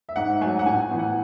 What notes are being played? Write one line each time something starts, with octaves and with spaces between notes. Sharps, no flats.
E5
G#2 F#5
F#3 A3 G#5
F#5
A2 G#5
E3 B3
F#5